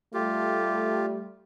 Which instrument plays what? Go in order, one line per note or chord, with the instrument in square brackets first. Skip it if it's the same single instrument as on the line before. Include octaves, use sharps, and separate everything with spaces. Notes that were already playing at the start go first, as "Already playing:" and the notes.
[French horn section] G3 A3 [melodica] F4 G4